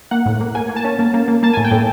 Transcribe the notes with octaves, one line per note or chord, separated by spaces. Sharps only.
A#3 F#5
A2
A#3
A#3 G#5
A#3
A5
C#4
A#3
A#3
A#3
A#3 A5
A2 G#5
G5
A2